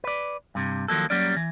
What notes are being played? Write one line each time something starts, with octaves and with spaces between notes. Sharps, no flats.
B4 D5
G2 C3
D#3 F3 F#3 A#3 A4
F#3 G3 A#3 C#4 D5
E3